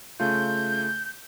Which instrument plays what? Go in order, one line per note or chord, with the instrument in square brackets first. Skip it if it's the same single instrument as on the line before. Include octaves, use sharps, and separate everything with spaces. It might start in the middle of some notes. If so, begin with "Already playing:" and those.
[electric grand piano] C#3 A3 F4 [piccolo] G6